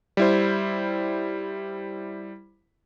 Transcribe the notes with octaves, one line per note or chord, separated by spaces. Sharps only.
G3 E4 C5